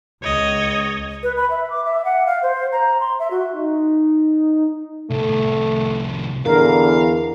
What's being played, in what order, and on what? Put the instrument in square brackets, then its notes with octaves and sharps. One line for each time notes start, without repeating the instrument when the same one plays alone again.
[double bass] C#2 [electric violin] C#5 D#5
[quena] B4
B5
E5
D6
E5
F#5
F5
C5
A#5
C6
E5
F#4
[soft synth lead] D#4
[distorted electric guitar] C2 A2 [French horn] A3
[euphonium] E2 [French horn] D3 [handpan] A#4 [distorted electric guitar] F5